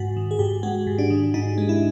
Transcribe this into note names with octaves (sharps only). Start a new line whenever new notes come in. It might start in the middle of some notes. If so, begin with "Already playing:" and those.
Already playing: G#2 F#4
D#3
G#4
G#2 G4
G#3 F#4
G#2
D4
D#3
G#2 D#4
G#3
E4